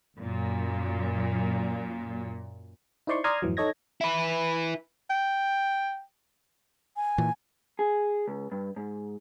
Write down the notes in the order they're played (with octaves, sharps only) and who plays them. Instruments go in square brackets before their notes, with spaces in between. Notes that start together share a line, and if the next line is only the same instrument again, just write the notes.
[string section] F#2 A#2
[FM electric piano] D#4 E4 C5 D5 C6 C#6
D5 A#5 C6 D#6 F6 G#6
F2 G#2 E3 F#3
D#4 A4 C#5 D#5 G#6 A#6
[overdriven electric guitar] E4 B4
[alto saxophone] G5
[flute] G#5
[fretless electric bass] A#2 E3
[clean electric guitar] G#4
C#2
G2
G#2